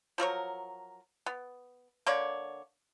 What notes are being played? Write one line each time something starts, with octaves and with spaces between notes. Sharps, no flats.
F3 F#3 A#4 C#5
B3
D3 A#3 C#5 D5